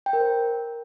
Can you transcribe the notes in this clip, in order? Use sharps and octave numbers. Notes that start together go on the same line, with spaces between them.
G5
A#4
C5